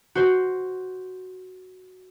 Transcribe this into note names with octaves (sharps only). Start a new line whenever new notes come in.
F#4 C5